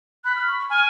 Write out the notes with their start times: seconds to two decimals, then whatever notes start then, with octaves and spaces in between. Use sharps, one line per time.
0.25 B5 F#6
0.36 F6
0.48 C#6
0.59 C#6
0.70 G#5 F6